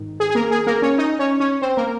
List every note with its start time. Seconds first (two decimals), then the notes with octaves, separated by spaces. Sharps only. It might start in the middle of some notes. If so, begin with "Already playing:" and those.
Already playing: G#2 D#3
0.20 G#4
0.30 G#4
0.35 A#3 A#4
0.51 G#4
0.67 A#3 A#4
0.82 C#4 C#5
0.98 D#4 D#5
1.19 C#4 C#5
1.40 C#4 C#5
1.62 C4 C5
1.77 A#3 A#4